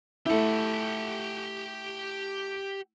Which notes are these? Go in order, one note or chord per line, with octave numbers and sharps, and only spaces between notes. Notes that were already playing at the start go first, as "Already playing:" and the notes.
A3 E4 G4 F#5